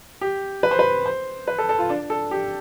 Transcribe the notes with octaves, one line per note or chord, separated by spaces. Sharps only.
G4
B4
C5
B4
C5
B4
A4
A4
F4
D4
A4
G4